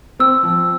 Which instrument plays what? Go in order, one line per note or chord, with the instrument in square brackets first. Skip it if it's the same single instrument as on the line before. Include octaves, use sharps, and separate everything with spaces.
[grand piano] C4 [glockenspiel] E6
[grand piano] F3